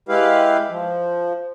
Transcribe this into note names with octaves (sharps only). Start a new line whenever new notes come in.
G#3 E4 G4 B4 F5
F3